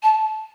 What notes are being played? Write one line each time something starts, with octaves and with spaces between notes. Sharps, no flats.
A5